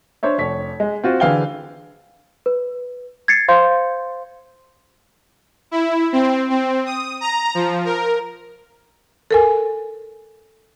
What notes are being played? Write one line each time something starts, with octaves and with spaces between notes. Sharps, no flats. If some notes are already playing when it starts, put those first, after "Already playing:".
D4 C5 C#5 E5
F1 C#5 B6
G#3
C4 F4 F#4
D3 E3 G#4 F5 G5 G7
B4
G#6 A6 C7 C#7
C5 F5 C6 G6
E4
C4
C4
D#6
A#5
F3
A#4
A4 A#4 G#5